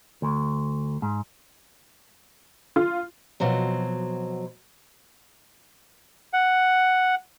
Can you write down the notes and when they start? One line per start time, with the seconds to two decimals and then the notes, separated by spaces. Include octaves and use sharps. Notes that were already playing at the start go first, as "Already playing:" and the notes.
0.22 D2
1.02 G#2
2.76 F4
3.40 B2 F3 F#3 C4
6.33 F#5